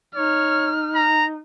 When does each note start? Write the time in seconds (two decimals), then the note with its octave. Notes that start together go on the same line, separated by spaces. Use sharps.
0.15 D#4 C#5 F6
0.95 A#5